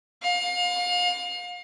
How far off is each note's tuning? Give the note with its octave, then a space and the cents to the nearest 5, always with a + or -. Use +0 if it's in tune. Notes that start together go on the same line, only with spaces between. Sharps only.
F5 +35